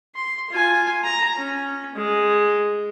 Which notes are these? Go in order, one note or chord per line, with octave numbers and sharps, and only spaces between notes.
C6
F4 G#5
A#5
C#4
G#3